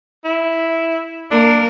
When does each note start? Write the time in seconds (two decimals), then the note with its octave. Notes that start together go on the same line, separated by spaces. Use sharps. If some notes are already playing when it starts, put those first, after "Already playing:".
0.25 E4
1.31 A#3 D4 A#4